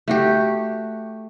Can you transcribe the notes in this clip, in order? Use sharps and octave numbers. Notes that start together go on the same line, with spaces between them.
A3 F#4 G4